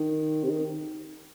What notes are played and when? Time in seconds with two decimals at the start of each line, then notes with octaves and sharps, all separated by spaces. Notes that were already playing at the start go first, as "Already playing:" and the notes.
Already playing: D#3
0.44 C3
0.50 D#3